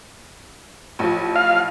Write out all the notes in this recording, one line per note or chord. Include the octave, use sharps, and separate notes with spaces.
A1 F3
F5